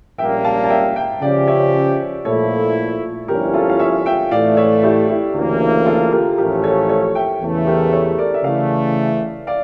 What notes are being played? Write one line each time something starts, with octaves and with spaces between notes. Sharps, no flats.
A#1 A#2 G3 A#3 C#4 E5 G5
F5 A5
A5
E5 G5
E5 G5
C#3 F3 C#4 G4 D5 F5
C#5 E5
A#2 F3 A3 E4 A4 C#5
G1 G2 F3 C#4 E4 G4 A#4
F4 A4
F5
C#5 E5
E5 G5
A2 E3 A3 D5 F5
C#5 E5
E4 G4
E4 G4
D2 C#3 E3 A#3
F4 A4
G4 A#4
A1 A2 F3 A3 C#4 G4 A#4
A4 C#5
A4 C#5
E5 G5
E2 C#3 E3 A3
G4 A#4
A4 C#5
A#4 D5
E5
C#3 E3 A3 D5 F5
D5 F5